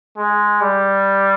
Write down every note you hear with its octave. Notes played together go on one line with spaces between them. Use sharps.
G#3
G3